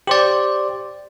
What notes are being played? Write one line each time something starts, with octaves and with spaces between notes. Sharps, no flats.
G4 C5 D5